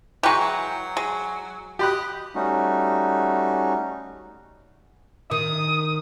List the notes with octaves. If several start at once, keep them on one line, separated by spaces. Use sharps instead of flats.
E3 G#3 B4 G5 A#5 C#6
F#3
G#3
G4 D#5 B5 F#6
G3 A3 C#4 D#4 F#4
D#3 D#6